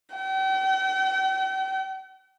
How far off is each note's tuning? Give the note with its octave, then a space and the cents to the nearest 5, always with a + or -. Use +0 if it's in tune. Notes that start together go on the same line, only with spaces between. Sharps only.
G5 -45